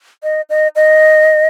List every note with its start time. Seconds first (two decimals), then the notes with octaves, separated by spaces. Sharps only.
0.23 D#5
0.50 D#5
0.75 D#5